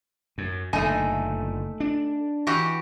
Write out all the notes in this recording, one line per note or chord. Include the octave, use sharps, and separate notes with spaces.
F#2
F#1 A#2 D3 A3 D#4 G#5
D4
E3 F#4 G4